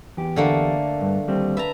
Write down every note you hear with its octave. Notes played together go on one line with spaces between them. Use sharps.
E2 G4
D3 A3 A#3
G2
D#2 G3 C4
B4 E5 A5 A#5